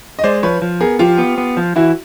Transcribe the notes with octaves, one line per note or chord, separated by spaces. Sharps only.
D#5
G#3 C5 D5
F3 B4 C#5
F3
B3 G#4 A#4
F3 F4 G4
B3
B3
F3
E3 E4 F#4